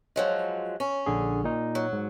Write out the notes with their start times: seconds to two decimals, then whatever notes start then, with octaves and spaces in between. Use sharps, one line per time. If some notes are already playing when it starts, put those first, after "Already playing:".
0.16 F3 F#3 G#3
0.80 C#4
1.06 A#1 D3 G#4
1.44 A#2 D#4
1.75 F#3
1.93 G#2